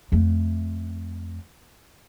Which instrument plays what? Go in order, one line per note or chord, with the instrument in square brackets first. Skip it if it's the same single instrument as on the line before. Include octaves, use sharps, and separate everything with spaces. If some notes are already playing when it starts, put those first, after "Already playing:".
[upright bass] F2 A3